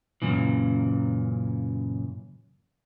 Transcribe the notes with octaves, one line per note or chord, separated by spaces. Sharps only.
F#2 A#2 C#3 E3